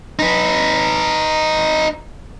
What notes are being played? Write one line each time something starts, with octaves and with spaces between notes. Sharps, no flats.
D#4 B4